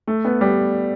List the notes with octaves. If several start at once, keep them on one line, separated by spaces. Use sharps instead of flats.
A3
B3
G3